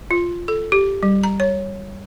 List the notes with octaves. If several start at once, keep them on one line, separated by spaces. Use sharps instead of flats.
F4
A4
G4
G3
A#5
C#5